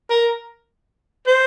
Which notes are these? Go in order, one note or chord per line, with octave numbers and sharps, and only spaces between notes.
A#4
C5